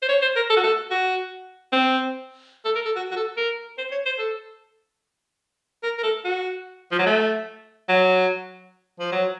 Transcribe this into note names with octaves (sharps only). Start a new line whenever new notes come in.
C5
C#5
C5
A#4
A4
F#4
A4
F#4
C4
A4
A#4
A4
F#4
F#4
A4
A#4
C5
C#5
C5
A4
A#4
A#4
A4
F#4
F3
F#3
A3
F#3
F3
F#3